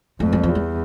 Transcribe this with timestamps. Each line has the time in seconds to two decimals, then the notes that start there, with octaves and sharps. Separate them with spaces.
0.20 F2 A3
0.33 G3
0.43 F3
0.49 E2
0.55 G3